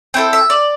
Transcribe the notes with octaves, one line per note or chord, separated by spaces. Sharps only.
C4 E4 A4 G5
E5
D5